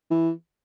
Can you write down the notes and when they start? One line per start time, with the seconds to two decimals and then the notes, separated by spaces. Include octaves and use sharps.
0.11 E3